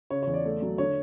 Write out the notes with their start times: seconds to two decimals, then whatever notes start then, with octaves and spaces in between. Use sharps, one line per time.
0.10 C#3 C#5
0.23 E2 C#5
0.33 D5
0.45 A3
0.62 F#3
0.78 D3 C#5